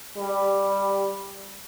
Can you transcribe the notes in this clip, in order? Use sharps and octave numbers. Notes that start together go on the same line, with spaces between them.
G3